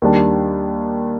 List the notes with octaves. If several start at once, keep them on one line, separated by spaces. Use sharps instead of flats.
D#2 D#3 G3 D4